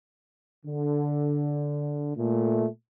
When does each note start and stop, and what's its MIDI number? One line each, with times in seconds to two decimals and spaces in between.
0.66 2.13 50
2.16 2.66 46
2.16 2.66 57